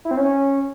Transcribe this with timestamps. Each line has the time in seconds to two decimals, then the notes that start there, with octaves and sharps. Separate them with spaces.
0.05 E4
0.11 C4
0.17 C#4